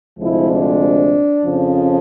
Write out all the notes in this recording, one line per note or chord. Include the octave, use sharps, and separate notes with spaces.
D2 C3 F3 G#3 E4
D4
F2 C#3 F3